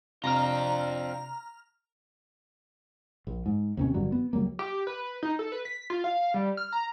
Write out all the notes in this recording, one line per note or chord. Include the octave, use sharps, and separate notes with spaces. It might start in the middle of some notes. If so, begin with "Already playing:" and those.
C3 C4 D4 F4 A#5 F6
A#1
G#2
D#2 C3 C#4
G#1 G2 D3 F#3
B3
C#2 F#3 G3 A#3
G4
B4
D#4
A4
B4
B6
F4
F5
G3
F6
A#5